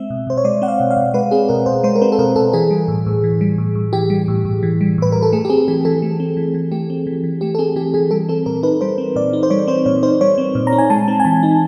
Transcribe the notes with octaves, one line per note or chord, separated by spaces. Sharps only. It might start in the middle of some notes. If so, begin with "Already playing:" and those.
Already playing: G#3 C4 E5
B2
B2 C5
C#5
G#3 D5
C4 F#5
F5
B2
F5
B2
G#3 B4
C4 G#4
B2 A#4
B2 C5
G#3 C5
A#4
C4 B4
A4
B2 A#4
B2 A4
E3 G#4
G3
A2
A2
E3
G3
A2
A2
E3 G4
G3
A2
A2
E3
G3
A2 B4
A2 A#4
A4
A3 G#4
G4
C4 G#4
E3 G#4
E3 A4
A3
C4
E3
E3
A3 G4
C4
E3
E3
A3 G4
A4
C4 G#4
E3 G4
E3 G#4
G3 A4
C4 A4
A#2 A#4
D#4 B4
G3 C5
C4
A#2 D5
D#4
C5
G3 C#5
C4 C5
A#2 C#5
D#4 C5
G3 C#5
C4
A#2
A#5
D#4
G#5
G#3 A5
C4
G#5
E3 A5
D#4